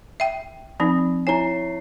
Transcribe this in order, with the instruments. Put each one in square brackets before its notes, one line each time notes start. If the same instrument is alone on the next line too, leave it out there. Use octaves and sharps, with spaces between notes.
[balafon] E5 G5
F3 C4 D#4
[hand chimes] E4 C#5 C7 [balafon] G#5 A#5